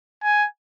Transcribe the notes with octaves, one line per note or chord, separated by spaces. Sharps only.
G#5